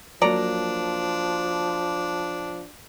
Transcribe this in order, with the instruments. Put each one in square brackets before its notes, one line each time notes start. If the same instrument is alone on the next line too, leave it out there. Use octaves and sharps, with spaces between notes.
[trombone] F3 [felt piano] F#3 A#3 [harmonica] D4 [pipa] C#5 D5 A#5